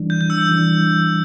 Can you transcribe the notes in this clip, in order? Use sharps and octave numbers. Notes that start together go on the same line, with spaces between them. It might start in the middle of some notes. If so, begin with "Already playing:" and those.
Already playing: E3 G3 D4
G6
G6
E6
E3 G3 D4